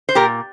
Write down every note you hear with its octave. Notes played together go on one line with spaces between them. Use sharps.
C5
A#2 G4 A#4